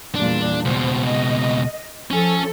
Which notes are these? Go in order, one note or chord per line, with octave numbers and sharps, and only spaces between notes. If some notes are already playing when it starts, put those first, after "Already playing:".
E2 A#2 G3 D4
C#2 B2 C5
D#5
F3 C#4 A4 G#5